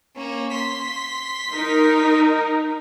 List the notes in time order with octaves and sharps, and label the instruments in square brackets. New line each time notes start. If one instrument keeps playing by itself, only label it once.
[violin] A#3 C#4
C6 B6
[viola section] D#4 A#4